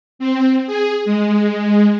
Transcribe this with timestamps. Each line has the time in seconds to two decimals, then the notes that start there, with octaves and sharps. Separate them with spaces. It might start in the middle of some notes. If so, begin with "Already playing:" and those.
0.19 C4
0.67 G#4
1.05 G#3